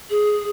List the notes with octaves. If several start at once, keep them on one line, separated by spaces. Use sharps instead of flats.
G#4